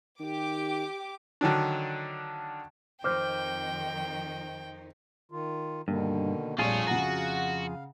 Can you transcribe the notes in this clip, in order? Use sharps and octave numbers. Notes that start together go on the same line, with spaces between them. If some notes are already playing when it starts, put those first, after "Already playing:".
D#3 G4 D6
D3 D#3 F#3 D4
F2 D#3 D#4 C5 G5 D6 F6 G6
D#3 F4
G2 B2 D3 D#3 A#3
A#1 F2 G3 A3 F4 G#4 C#5 F5
C#3 F#4 F#5 A#5